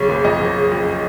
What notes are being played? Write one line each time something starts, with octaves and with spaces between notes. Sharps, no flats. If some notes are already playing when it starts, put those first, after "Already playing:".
Already playing: B1 C#3 C#5
F#1
F2 D#5
F#1
C#3
F2